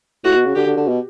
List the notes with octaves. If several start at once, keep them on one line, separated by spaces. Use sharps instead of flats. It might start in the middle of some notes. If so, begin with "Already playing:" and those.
A2 F#4
B2
C#3
D3 G4
D3
D3
B2